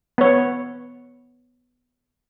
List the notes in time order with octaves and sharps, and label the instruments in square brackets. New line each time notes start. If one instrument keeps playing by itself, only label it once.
[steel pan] B3 C#5